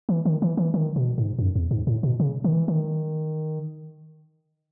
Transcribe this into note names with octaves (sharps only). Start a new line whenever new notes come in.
E3
D#3
E3
E3
D#3
B2
G#2
F#2
E2
G#2
A2
B2
C#3
D#3
E3
D#3